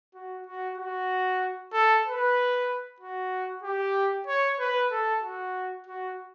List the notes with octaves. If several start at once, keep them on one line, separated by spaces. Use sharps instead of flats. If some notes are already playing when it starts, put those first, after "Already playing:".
F#4
F#4
F#4
A4
B4
F#4
G4
C#5
B4
A4
F#4
F#4